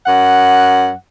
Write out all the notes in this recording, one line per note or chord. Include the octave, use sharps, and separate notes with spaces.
F#2 F#5